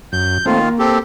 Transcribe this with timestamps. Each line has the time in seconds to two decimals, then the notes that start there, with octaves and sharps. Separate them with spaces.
0.13 F#2 G6
0.46 D#3 A3 A#3 C4 F4
0.63 A#3
0.79 C4 G4 A4